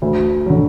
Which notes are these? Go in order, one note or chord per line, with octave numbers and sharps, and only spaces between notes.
D2
D3 F#3